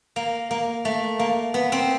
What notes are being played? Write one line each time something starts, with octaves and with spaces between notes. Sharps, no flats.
A#3
A#3
A3
A#3
B3
C4